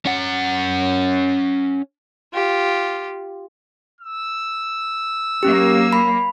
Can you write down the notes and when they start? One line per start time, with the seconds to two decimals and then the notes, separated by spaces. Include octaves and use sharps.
0.06 C#4 F#5
2.33 F4 G4
4.01 E6
5.43 F#3 A#3 C#4 G4
5.93 B5